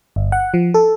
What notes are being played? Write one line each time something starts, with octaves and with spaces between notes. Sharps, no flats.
G1
F#5
F3
A4